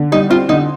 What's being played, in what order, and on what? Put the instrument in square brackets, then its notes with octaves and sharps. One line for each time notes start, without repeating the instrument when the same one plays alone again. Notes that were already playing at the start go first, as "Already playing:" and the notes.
Already playing: [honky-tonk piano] D3
[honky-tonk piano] G3 [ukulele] D#4
[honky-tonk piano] C4 [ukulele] F4
[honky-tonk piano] D3 [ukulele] D#4